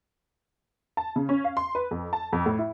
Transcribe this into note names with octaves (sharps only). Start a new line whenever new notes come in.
A5
C#3
C#4
F5
C6
B4
F2
A5
F2
A2
E4